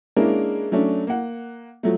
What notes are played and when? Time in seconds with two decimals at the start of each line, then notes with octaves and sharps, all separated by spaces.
0.16 G#3 A#3 C#4 D4 E4 A#4
0.72 F#3 A3 C#4 D4
1.07 A#3 F#5
1.83 F3 F#3 A3